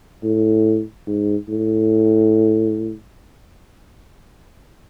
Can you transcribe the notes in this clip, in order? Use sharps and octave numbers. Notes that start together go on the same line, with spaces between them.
A2
G#2
A2